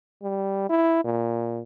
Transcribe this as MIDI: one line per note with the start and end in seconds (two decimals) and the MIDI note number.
0.22 0.69 55
0.69 1.01 64
1.04 1.62 46